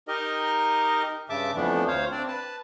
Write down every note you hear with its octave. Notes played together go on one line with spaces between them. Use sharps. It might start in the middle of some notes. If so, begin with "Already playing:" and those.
D#4 G4 A#4 D#5
G2 C#3 E5 A5 D6
F2 E3 F3 A3 B3 D4
D2 C5 C#5 F5
C4 D4 D5
B4 A5